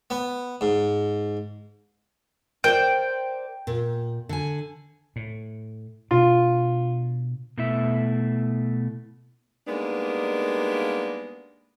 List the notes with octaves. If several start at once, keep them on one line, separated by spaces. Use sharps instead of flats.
B3
G#2
A#4 C5 D5 G5
A#2
D3 G#5
A2
B2 D4 F4
B2 A3 E4 E5
G3 G#3 A#3 B3 D4 D#4